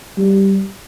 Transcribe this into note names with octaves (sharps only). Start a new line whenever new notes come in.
G3